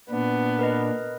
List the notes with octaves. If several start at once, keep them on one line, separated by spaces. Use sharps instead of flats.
A#2 B3 D4
A#4 B4 D#5